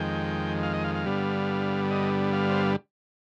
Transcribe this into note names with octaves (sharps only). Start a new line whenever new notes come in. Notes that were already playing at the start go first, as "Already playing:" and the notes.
Already playing: F2 D#3 G#3 G5
F5
D#5
F5
F5
G2 D3 G3 B3
D#5
F5
C5